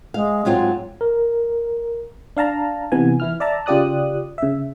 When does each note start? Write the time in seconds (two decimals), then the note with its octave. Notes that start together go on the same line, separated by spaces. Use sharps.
0.14 G#3 F5
0.45 G#2 F#3 C4 F4
1.01 A#4
2.37 D4 F5 A5 A#5
2.92 C3 E3 B3 G#5
3.20 E3 E4 F6
3.40 D5 E5 A5 A#5
3.66 C#3 F4 G4 D5 D#6 F#6
4.38 C#3 E5